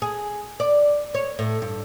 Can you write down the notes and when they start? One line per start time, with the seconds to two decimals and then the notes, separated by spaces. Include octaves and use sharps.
0.02 G#4
0.60 D5
1.14 C#5
1.39 A2
1.62 G2